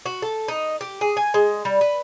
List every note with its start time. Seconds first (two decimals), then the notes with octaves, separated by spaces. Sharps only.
0.06 F#4
0.22 A4
0.48 D#4
0.81 G4
1.01 G#4
1.17 G#5
1.34 G#3
1.65 G3
1.81 B4